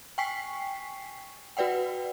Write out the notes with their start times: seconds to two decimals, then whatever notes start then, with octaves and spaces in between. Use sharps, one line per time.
0.18 G5 G#5 C#6 B6 C7
1.57 F#4 B4 D5 F#5 G5